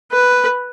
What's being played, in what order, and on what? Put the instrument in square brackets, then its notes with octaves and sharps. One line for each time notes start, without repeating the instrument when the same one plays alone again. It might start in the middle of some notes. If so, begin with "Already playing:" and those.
[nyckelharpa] B4